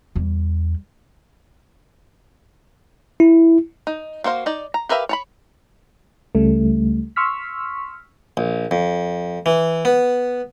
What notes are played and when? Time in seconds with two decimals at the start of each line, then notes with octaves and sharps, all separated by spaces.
0.16 E2 G3
3.20 E4
3.87 D#4
4.24 A#3 F#4 C5 F5
4.46 D#4 D5
4.74 A#5
4.89 G4 A#4 B4 E5 F5
5.09 C#5 A5 B5
6.35 C#2 C#3 G3 A3
7.16 C6 C#6 E6 F6 B6
8.37 A#1
8.71 F2
9.46 E3
9.85 B3